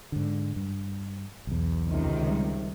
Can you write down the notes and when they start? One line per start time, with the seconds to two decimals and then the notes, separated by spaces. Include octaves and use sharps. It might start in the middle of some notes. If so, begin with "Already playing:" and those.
0.12 G#2 D3
0.56 G2
1.47 B1 E2
1.87 C#2 C3 D#3
2.29 G3